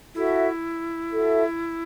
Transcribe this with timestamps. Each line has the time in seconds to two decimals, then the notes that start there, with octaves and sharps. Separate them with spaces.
0.15 E4 F#4 A4 E5
1.09 F#4 A4 E5